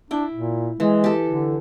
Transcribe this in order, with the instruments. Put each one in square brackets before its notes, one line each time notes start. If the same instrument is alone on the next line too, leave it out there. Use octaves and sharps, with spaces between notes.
[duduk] D4 [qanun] E4 G5
[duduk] A#2
[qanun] E3 [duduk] G#3
[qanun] G4 A4
[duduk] D3